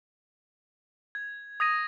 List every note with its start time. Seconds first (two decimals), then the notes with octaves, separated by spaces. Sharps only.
1.15 G#6
1.60 D#6 G#6 A#6 D#7